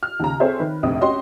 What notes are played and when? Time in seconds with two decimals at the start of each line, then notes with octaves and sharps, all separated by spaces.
0.03 F6
0.20 D#2 C#3 A#5
0.40 C4 G#4 A4 C5 C#5 E5
0.59 D#3 B4
0.83 F1 A#1 C4 D#6
1.01 C#4 F#4 G4 D#5 C6